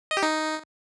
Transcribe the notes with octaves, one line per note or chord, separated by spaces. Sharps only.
D#5
G4
D#4